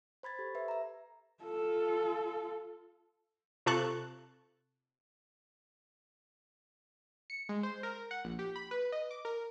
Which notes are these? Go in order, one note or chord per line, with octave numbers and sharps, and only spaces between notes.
C5 B5 G#6 A6
G4 A4
B4 E5
E5 A#5
F4 A4
C3 F4 A4 A5 C#6 F#6
C#7
G#3
C5
A#4
F#5
A#1
G4
B5
B4
D#5
D6
A#4